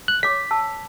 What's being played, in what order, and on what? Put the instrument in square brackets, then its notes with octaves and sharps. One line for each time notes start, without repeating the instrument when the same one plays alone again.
[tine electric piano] F#6
[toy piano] C#5 D6 [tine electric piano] B6
[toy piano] A5 E6